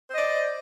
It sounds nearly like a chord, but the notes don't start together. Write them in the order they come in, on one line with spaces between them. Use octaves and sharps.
C5 D#5 D5